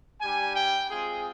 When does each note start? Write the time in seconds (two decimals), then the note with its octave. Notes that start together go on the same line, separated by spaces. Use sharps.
0.20 G3 D4 G4 G#5
0.56 G5
0.89 G#3 C4 F4 G#4